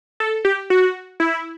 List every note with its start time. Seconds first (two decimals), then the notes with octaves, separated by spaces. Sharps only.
0.20 A4
0.45 G4
0.70 F#4
1.20 E4